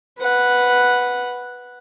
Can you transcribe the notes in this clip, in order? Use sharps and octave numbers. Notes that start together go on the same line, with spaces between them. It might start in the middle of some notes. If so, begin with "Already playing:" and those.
B4 F#5